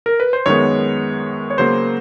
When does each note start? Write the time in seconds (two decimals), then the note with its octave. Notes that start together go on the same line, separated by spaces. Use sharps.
0.06 A#4
0.20 B4
0.33 C5
0.46 F#2 D#3 G#3 B3 C#5
1.50 C#5
1.58 C#3 F#3 A#3 C5